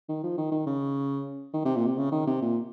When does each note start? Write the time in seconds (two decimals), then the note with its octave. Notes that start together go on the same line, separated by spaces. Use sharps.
0.09 D#3
0.24 F3
0.38 D#3
0.52 D#3
0.67 C#3
1.54 D#3
1.65 C3
1.76 A#2
1.86 C3
1.98 C#3
2.12 D#3
2.27 C3
2.42 A#2